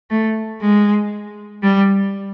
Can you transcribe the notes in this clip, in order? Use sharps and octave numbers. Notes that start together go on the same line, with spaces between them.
A3
G#3
G3